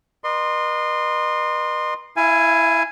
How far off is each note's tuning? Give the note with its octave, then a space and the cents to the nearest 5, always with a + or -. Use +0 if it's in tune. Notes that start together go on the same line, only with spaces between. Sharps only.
B4 -40 D#5 -35 C6 +0
E4 +0 F5 -35 G#5 +0